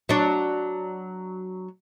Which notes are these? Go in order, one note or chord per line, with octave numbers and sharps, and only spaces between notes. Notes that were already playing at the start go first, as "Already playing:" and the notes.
F#3 D4